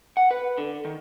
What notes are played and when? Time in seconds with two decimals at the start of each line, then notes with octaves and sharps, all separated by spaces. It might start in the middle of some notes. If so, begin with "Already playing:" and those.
0.17 F#5
0.31 B4
0.58 D3
0.85 D#3